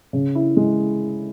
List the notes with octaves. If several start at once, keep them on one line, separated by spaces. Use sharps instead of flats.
C#3
E4
G#3